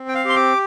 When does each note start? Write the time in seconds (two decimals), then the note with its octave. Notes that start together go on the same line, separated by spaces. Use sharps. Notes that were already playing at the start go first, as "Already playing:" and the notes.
Already playing: C4
0.09 G5
0.15 F5
0.25 G4 C6
0.36 D6